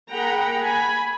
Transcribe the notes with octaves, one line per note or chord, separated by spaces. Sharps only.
A#3 G#4 F#5 G5 A#5 B5
G#5 B5